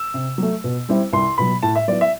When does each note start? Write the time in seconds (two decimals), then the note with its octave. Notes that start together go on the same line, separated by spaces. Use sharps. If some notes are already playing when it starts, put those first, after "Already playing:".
Already playing: E6
0.14 C3
0.38 F#3 A3
0.64 B2
0.89 G3 C4 E4
1.13 C2 C6
1.38 B2 F#3 B5
1.63 A2 A5
1.75 E5
1.88 F#3 B3 E4 D5
2.01 E5